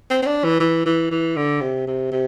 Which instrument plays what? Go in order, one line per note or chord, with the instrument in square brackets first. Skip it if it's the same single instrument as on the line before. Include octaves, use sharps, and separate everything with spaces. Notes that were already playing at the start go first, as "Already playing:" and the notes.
[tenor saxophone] C4
C4
D4
E3
E3
E3
E3
D3
C3
C3
C3